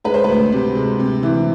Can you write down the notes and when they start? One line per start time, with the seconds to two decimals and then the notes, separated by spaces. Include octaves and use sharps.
0.04 G#3 B4
0.14 C5
0.24 D2 B4
0.52 C3
0.75 G#3
1.00 C3
1.23 E3